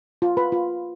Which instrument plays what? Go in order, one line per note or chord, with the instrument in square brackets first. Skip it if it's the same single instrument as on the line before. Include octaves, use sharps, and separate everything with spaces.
[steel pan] F4
B4 B5
F4